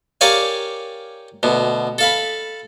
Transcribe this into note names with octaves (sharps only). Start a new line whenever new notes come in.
G4 A#4 C#5 D5 F5 G#5
D2 B2
A4 F5 B5